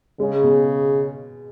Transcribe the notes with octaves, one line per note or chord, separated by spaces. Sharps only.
C#3 G#3
B2